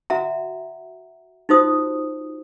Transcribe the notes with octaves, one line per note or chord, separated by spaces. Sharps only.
F#4 E5 F#5 A#5
D#4 F4 F#4 C5 D#6